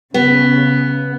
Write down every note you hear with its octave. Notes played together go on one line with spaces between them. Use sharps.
C#3 B3